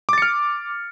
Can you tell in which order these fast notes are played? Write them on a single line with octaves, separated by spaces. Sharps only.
D6 A6 C#7 F6